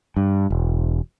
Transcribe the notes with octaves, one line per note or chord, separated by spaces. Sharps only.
G2
E1